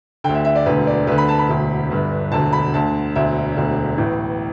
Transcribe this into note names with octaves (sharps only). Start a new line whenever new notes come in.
D2 D3 G5
E5
E5
D5
E1 D2 D3 B4
D5
D2 D3 B4
B5
A5
B5
E1 D2 D3
G1 G2 D3
E1 D2 D3 A5
B5
D2 D3 A5
E1 D2 D3 E5
E1 D2 D3
A1 A2 E3